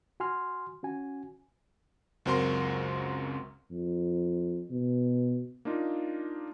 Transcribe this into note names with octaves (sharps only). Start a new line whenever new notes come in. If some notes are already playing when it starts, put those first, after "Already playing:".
F#4 G#5 C6 F6
C#4 F#4 G#5
C#2 F#2 C4 F#4 A#4 C6
F2
B2
A#3 D4 D#4 F4